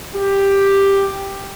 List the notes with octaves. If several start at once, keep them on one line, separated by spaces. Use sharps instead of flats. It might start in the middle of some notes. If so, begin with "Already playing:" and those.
G4